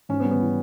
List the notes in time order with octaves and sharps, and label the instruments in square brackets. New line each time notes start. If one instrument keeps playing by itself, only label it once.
[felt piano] G#2 C#4
B3
G3
B3
E3